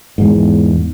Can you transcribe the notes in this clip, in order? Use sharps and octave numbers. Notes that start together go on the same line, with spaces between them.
E2 G#2